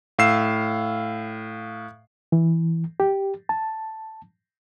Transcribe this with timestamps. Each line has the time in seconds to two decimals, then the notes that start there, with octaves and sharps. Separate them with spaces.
0.19 A2 F5 E6 C7 E7
2.32 E3
3.00 G4
3.49 A5